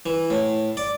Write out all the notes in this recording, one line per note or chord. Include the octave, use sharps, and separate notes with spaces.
E3
A2
D5